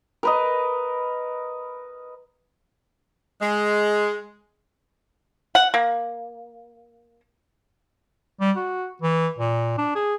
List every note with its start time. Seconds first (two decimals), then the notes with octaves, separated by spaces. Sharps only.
0.23 A#4 B4 D#5
3.41 G#3
5.55 F#5
5.74 A#3
8.41 G3
8.56 F#4
9.02 E3
9.38 A#2
9.78 D4
9.95 G#4